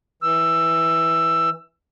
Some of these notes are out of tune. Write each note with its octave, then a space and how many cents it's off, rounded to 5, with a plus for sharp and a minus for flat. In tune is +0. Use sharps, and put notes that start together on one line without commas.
E3 -5 E6 +15